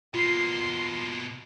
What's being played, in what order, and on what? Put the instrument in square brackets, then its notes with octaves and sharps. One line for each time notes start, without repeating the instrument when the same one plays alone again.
[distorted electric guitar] B2 A#3 [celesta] F4 C7 [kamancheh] C6